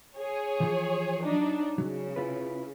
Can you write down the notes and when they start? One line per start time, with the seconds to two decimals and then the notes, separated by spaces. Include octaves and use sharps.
0.16 G#4 C#5
0.60 E3 F3
1.23 F#3 D4 D#4
1.78 C#3 F#3
2.16 E4 F4 B4